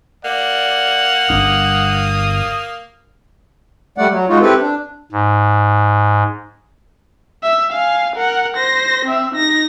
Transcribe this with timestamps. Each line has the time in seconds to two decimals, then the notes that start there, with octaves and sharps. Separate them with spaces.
0.25 A#3 D5 F#5
1.30 G1 G3 D4 D#6
3.98 G3 A3 D5 F#5
4.12 F#3
4.29 G#3 D#4 F4 F#4
4.41 C4 E4 G4 A4 B4
4.61 D4
5.12 G#2
7.44 E5
7.73 F5 G#5
8.16 A#4 F#5
8.57 C5 A#6
9.05 C4 E5
9.35 D#4 A#6